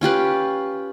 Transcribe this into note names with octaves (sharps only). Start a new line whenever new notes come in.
C#4 F4 G4 B4